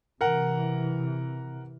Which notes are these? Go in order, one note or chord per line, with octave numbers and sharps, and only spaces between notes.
C3 E3 A#4 F#5